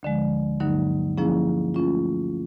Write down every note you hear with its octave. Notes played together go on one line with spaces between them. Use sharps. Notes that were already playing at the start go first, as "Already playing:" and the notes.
D2 D3 F3 G#3
G2 D3 F#3 A#3 D#4
F3 A#3 C#4 E4 G#4
F3 A3 C#4 F4